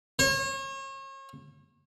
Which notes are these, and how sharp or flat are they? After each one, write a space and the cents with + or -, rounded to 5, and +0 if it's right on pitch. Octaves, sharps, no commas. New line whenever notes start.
C#5 -40